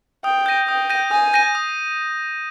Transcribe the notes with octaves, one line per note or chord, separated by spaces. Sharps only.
G5 D#6
G6 A#6 D#7
G5 D#6
G6 A#6 D#7
G#5 D#6
G6 A#6 D#7
D#6